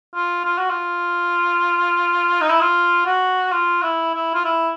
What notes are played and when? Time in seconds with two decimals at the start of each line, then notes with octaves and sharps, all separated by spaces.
0.15 F4
0.45 F4
0.58 F#4
0.70 F4
2.41 D#4
2.50 E4
2.61 F4
3.06 F#4
3.52 F4
3.83 E4
4.14 E4
4.34 F4
4.45 E4